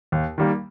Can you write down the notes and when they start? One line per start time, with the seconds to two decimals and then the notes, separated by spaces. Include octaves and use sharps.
0.12 D#2
0.38 D#3 G3 A#3